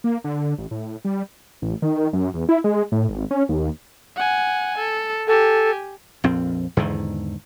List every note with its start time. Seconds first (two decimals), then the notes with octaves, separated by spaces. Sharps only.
0.04 A#3
0.24 D3
0.58 A1
0.71 A2
1.05 G3
1.62 A1
1.82 D#3
2.13 F#2
2.34 E2
2.49 E4
2.64 G#3
2.92 A2
3.09 G#1
3.31 C#4
3.49 D#2
4.16 F#5 G#5
4.78 A4
5.27 G4 A4 G#5
6.24 A#1 F2 C4
6.77 E2 G#2 D3 D#3